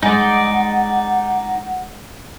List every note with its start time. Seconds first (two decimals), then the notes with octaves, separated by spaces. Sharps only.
0.03 G#3 D#4 D5 F#5